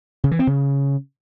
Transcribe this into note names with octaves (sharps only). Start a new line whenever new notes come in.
C#3
E3
C4
C#3